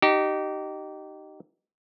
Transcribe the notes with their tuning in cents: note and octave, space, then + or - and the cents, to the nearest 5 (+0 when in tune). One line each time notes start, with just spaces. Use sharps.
D#4 -15 G4 -25